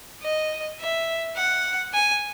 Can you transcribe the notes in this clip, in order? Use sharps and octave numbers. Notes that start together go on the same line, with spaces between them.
D#5
E5
F#5
G#5